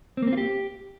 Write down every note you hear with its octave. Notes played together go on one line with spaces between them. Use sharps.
C4
A#3
C4
F4
G4